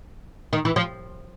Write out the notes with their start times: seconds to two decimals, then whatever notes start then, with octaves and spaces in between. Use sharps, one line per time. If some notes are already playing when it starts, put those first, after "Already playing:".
0.53 D#3
0.65 E3
0.76 F3